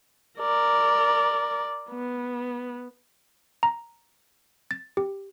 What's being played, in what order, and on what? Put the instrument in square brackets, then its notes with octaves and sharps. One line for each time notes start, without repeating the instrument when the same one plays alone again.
[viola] A#4 D5
B3
[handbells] A#5
A6
G4